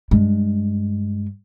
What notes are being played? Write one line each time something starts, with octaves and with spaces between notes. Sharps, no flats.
G2 G#3